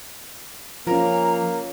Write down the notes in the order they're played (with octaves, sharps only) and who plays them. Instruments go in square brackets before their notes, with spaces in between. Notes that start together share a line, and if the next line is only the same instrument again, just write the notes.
[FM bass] F3 [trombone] A#3 [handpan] C#4 F4 [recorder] A#5